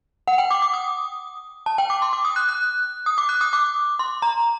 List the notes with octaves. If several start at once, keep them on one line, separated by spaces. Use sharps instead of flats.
F#5
G5
D6
D6
D#6
A5
G5
D6
C6
D6
D#6
F#6
F#6
D#6
D6
F#6
D#6
D6
C6
A#5